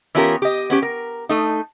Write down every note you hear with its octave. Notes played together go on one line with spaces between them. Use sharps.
E3 B3 C#4 F4 G4 A#4
G4 D#5
B3 C#4 G4
A#4
A3 D#4